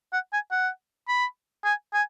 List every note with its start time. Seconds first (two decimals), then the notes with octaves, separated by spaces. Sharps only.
0.13 F#5
0.33 G#5
0.51 F#5
1.08 B5
1.65 G#5
1.94 G#5